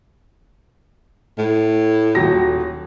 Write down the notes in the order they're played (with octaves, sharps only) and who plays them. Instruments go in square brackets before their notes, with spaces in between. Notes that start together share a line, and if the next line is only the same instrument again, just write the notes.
[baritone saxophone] A2
[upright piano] D#1 F#3 A#6